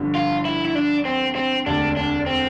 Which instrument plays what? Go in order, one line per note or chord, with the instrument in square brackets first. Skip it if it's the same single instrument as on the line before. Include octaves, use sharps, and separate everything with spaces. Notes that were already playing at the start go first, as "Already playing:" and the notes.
Already playing: [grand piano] G1 G2 D3 F3
[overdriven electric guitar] F4
E4
E4
D4
C4
C4
[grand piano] E1 D2 C3 [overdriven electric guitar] D4
[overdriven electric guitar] D4
C4